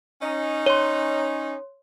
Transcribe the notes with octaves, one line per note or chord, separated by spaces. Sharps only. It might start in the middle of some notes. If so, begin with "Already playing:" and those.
C#4 D#4
C#5 C6